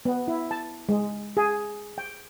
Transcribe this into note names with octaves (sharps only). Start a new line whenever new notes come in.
B3
E4
A5
G#3
G#4
G5